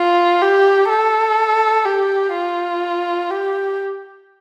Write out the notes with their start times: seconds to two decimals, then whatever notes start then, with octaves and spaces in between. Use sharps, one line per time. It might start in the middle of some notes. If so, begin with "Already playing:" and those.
Already playing: F4
0.42 G4
0.89 A4
1.85 G4
2.33 F4
3.30 G4